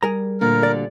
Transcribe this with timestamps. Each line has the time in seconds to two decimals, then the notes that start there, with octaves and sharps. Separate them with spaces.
0.03 G3 G#4 A#4 A#5
0.41 D2 A#2 D3 A#4
0.63 D5